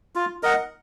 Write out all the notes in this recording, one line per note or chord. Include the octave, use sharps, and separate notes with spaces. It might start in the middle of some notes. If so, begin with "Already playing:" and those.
F4
A#4 D#5 F#5